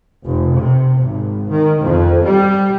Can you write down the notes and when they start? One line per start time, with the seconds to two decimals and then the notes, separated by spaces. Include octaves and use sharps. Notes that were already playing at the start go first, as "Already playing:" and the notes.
0.24 F1
0.54 C3
0.97 G#1
1.48 D#3
1.81 F2
2.23 G3